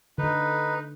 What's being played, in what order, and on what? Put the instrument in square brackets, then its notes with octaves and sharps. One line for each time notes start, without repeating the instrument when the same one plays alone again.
[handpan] D3 [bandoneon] D#4 B4